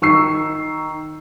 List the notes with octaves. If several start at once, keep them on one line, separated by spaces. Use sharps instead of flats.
D#3 C#6 E6 C7